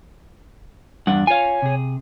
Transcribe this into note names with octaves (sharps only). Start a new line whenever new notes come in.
E2 G2 D4 F#5
F4 C#5 F5 G#5
C3 G#4